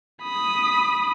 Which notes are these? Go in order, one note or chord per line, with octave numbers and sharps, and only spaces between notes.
B5 D#6